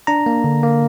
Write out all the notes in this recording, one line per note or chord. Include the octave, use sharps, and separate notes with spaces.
D4 A#5
A#3
D3
A#3